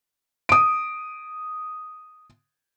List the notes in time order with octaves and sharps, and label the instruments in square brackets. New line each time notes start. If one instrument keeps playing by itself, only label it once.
[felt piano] D#6 D7